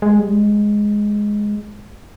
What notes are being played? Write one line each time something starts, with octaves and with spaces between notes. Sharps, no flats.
G#3
G3
G#3